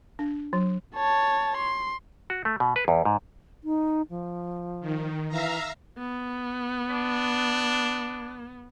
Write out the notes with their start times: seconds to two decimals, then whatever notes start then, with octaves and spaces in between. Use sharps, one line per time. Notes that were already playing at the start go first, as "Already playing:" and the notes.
0.19 D4
0.53 F#3
0.96 C#5 A5
1.57 C6
2.30 F#4
2.45 A3
2.60 B2
2.76 B4
2.88 E2
3.05 G#2
3.64 D#4
4.10 F3
4.80 D#3
5.28 E3 E5 F5 A#5
5.98 B3
6.90 D4